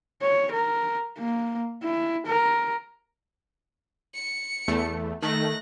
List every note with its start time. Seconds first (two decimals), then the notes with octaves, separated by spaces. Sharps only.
0.22 C#5
0.51 A#4
1.18 A#3
1.83 E4
2.27 A#4
4.14 C#7
4.68 E2 A3
5.22 D#3 A3 F#6 A#6